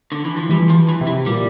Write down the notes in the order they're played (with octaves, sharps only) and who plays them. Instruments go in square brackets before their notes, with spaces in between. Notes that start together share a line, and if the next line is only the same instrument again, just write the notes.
[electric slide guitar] D3
E3
F3
[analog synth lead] E3 [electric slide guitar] G3
[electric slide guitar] F3
E3
[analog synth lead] C3
[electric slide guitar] E3
[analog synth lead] A#2 [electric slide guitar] G3